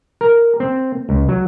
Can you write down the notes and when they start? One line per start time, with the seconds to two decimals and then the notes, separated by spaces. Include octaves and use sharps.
0.21 A#4
0.60 C4
1.09 C#2
1.29 F#3